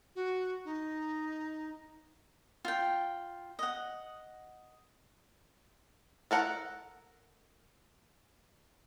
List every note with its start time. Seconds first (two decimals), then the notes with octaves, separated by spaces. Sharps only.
0.15 F#4
0.65 D#4
2.65 F4 G5
3.59 D#5 F#5
6.31 A4 A#4 F#5